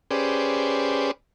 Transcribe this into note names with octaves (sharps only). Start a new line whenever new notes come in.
C#4 G4 G#4 B4 C5 D5